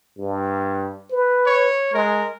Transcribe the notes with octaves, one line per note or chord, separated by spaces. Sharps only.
G2
B4
C#5
G#3 A#4